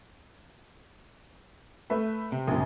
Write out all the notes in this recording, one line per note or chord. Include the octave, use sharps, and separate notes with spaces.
A3 B4 E5
C3
A#1 F#2